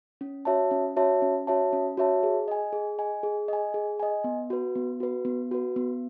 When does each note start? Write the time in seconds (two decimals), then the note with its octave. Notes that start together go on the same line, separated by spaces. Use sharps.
0.21 C#4
0.45 F#4 C#5 E5 A5
0.71 C#4
0.97 F#4 C#5 E5 A5
1.22 C#4
1.47 F#4 C#5 E5 A5
1.73 C#4
1.97 F#4 C#5 E5 A5
2.23 G#4
2.48 D#5 G#5
2.73 G#4
2.99 D#5 G#5
3.23 G#4
3.48 D#5 G#5
3.74 G#4
4.00 D#5 G#5
4.24 B3
4.50 F#4 B4
4.75 B3
5.00 F#4 B4
5.25 B3
5.51 F#4 B4
5.76 B3